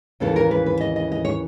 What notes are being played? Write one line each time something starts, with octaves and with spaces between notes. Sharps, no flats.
D#2 C#3 E3 A4
A#4
B4
B4
D#5
D#5
D#5
C#5